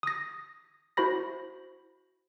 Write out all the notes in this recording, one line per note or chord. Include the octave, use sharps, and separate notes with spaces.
D#6 A#6
E4 F#4 C5 B5 A#6